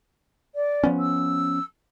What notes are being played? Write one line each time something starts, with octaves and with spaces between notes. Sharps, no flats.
D5
F3 B3 C#4
E6